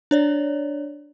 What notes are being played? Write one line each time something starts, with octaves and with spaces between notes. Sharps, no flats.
D4 C#5 D5